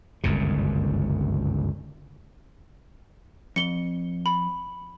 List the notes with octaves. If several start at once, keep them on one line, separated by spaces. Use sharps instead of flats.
G1 C#2 F#2 C3
F2 C#7 G7
B5